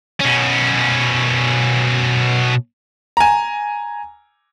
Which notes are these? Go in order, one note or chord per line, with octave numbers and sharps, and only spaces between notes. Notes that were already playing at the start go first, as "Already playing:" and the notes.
B2 C#4
G#5 A#5